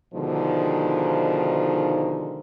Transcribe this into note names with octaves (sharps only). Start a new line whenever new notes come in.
B2 D3 D#3 F3 G#3 D#4